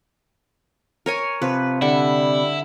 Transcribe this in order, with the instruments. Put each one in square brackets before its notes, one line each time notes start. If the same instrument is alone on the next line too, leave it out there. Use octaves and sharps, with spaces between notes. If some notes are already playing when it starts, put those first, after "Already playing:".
[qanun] A#4 C#5 G#5
[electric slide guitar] C3 [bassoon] F3 [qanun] B4
[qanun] D3 [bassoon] G3 [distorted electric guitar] E4